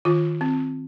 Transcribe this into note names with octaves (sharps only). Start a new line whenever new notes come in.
D#3 F4
C4